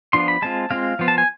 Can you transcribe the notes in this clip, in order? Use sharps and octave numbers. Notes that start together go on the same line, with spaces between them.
F3 B3 D4 F4 C6
B5
G#3 C4 F4 A5
G#3 C4 F4 F5
F3 B3 F4
A5
G#5